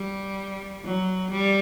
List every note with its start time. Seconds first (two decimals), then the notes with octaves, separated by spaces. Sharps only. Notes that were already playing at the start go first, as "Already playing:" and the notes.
Already playing: G3
0.84 F#3
1.31 G3